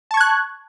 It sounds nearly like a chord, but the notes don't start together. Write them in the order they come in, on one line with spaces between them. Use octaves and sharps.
A5 C#6 G#6 F#6